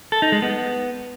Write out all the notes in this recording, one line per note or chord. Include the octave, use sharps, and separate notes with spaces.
A4
D#4
G#3
B3